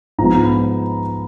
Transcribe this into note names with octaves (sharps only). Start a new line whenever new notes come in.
G#2 F3 G#3 B3 A#5
B5